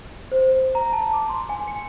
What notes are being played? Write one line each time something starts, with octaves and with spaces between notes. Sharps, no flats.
C5
A#5
A5
D6
C6
G#5
C#7